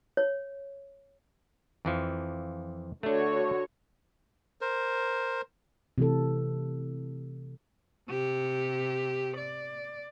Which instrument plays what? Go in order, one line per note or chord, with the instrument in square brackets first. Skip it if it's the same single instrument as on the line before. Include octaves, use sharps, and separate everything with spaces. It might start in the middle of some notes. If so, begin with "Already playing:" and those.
[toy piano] C#5
[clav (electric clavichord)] F2 E3 F3
[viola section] D3 F#4 C#5 [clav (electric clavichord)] A3 D4
[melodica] A#4 C5
[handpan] C3 E3 A3 A4
[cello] C3 G4
D5